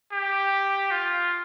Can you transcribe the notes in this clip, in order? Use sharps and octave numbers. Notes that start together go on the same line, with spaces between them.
G4
F4